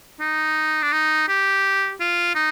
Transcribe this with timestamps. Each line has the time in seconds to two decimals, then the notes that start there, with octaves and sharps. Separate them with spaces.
0.20 D#4
0.83 D4
0.92 D#4
1.28 G4
2.00 F4
2.35 D#4